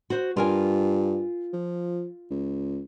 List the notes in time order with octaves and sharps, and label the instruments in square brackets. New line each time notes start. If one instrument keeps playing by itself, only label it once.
[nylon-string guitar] F#4 C5
[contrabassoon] G2 [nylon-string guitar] F4 A#4 G#5
[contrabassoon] F3
C#2